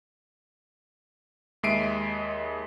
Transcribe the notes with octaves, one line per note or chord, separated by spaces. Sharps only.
D#2 G#3 E5 C7 D7 D#7